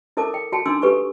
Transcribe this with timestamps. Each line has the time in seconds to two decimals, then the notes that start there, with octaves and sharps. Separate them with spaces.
0.17 E4 A4 A#4 A5 D6
0.34 G5
0.52 F#4 G5 A5
0.66 D4 D#4 G#5 C6 D6 E6
0.82 G4 A4 B4 G#5 C#6